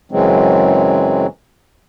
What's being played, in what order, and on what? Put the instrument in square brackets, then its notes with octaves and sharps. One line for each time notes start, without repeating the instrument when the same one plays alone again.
[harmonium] F#2 C#3 E3 F#3 G#3 C4